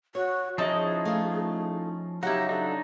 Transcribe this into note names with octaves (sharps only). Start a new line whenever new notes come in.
F#4 C#5
F3 C#4 D#4 E4 G#4 D#5 A5
A3 F4
C#3 F#3 D#4 E4 F#4 G4 F#5
D4 D#4 A4